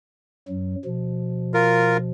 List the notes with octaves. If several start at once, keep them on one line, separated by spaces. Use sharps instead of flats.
F#2 F#3
B2 F3
F4 A#4